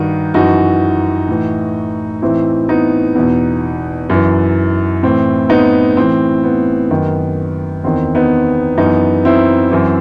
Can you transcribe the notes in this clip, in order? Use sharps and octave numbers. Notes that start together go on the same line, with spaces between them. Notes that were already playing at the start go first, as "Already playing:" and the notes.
Already playing: G2 D#3 D#4 F#4
F#2 E3 D#4 F#4
A2 E3
A2 E3 C4 E4
B3 D#4
E2 B2
F#2 E3
A2 E3 C4
B3 D#4
A2 E3 C4
B3
F#2 D#3
E2 D#3 C4
B3 D#4
F#2 E3 B3 D#4
C4 E4
F#2 E3